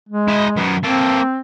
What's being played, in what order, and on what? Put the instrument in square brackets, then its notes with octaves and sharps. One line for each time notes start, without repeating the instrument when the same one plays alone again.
[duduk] G#3
[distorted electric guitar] E4 D#5
F#2 B3
[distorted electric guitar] A#3 A4 [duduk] C4